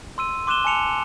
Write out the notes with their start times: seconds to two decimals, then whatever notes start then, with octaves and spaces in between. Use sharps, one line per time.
0.18 C6 E6 D#7
0.47 C6 D6 F#6 D#7 E7 G7
0.65 G#5 A5 C#7 F7